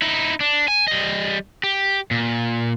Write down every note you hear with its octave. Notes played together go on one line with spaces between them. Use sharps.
D#4 E4
D4
G#5
G3 D#5
G4
A#2